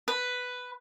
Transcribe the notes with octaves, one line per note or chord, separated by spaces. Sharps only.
B4